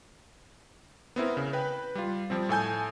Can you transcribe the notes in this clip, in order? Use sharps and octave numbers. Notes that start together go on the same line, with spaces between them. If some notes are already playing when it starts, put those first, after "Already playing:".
B3 C4 E4 A#4
C#3
B4 G5
G3 F4
F3 G3 C4
A2 A4 G#5 G6